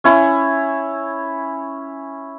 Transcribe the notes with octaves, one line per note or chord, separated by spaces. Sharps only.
C#4 E4 C#5